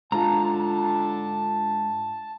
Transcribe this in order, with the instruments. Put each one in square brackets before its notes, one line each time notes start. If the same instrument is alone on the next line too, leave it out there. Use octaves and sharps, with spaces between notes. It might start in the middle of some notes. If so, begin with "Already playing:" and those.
[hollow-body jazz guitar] G#2 F4 [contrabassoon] D3 [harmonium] A5 [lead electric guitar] A#5